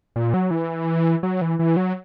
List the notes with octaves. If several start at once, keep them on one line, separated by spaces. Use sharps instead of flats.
A#2
F#3
E3
F#3
E3
E3
F#3